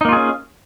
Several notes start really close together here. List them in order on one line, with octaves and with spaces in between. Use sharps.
D#4 A#3 F4 G#4 C#4